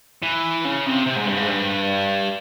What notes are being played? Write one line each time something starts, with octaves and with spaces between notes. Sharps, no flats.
E3
C#3
C3
C3
G#2
G2
G#2
G2